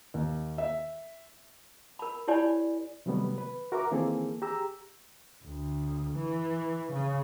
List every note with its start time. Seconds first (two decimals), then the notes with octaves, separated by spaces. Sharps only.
0.14 D#2
0.58 E5
1.99 A#4 B5
2.28 E4 G4 C#5 D5 G#5 B5
3.06 C3 D#3 F#3 G3 A3 B3
3.38 B4
3.72 F#4 A#4 E5 A#5 D6
3.91 D#3 E3 A#3 C4 G#4 A4
4.42 G4 G#4 A#5 E6
5.44 D2
6.16 E3
6.92 C#3